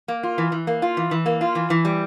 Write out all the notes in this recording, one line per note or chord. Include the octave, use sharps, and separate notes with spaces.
A#3
F4
E3
E3
A#3
F4
E3
E3
A#3
F4
E3
E3
G3